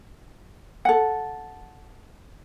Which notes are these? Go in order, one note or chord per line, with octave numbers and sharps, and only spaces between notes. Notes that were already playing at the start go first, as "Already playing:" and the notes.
A4 F#5